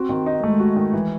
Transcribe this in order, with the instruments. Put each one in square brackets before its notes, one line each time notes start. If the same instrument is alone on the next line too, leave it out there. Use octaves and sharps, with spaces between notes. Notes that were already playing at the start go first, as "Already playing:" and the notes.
Already playing: [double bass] C4 [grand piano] F#4
[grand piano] D#3
D#4
[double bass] G#3 [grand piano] A3
[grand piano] F#4
D#3
E3